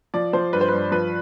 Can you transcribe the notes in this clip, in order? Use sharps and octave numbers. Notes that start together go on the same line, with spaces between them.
F3 D5
F3 C5
G2 B4
C5
G2 B4
F3 B4